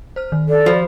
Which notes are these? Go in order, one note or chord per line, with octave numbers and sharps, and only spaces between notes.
C5 F6
D#3
A4 D5
F3 F#4 G4 B5